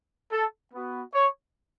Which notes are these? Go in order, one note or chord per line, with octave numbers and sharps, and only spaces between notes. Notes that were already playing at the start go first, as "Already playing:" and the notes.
A4
B3 F#4
C#5